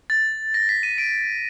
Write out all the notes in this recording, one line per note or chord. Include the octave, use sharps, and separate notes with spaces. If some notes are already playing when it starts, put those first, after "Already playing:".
A6
A#6
B6
D#7
D7